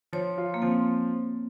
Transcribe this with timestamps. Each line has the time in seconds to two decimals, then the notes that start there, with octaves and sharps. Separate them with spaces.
0.13 F3 C#5
0.38 F4
0.54 A#3
0.62 F3 C4